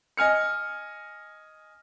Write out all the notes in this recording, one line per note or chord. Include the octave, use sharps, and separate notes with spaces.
D#5 G#5 F6 C#7